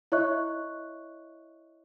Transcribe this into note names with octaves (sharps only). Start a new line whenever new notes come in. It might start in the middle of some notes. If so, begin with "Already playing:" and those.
E4 C#5 D#5 E5 C#6 F#6